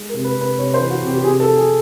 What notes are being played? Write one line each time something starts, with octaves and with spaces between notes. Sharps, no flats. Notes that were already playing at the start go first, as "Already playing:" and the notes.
Already playing: G#3
A#4
C3
B4
C3 B4
C3 C#5
C5
E3
F#4
C3 G4
G4
C3 G#4
A4
F3
G#4